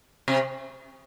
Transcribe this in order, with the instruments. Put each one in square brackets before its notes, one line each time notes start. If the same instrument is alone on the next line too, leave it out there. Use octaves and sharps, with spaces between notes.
[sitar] C3